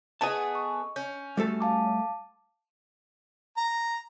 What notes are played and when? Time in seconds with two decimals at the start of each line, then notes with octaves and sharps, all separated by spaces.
0.21 A3 B3 G#4 D#5 A5
0.55 C#6
0.96 C#4 G6
1.37 G3 A3 F#4 A4
1.60 F5 A5 D6
3.57 A#5